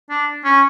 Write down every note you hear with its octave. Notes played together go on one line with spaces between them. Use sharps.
D4
C#4